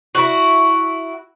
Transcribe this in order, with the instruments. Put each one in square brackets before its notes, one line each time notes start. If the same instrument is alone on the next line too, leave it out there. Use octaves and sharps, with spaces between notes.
[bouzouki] E4 F#4